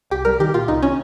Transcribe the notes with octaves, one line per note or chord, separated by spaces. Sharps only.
C2 G4
G3 A#4
D#3 G4
A#2 F4
C2 D#4
C#4